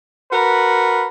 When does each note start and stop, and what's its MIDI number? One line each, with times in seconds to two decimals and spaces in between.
0.32 1.06 66
0.32 1.06 70
0.32 1.06 71